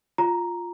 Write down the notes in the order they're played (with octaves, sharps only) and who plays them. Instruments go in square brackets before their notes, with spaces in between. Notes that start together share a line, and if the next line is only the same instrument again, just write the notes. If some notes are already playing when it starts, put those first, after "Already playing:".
[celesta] F4 A#5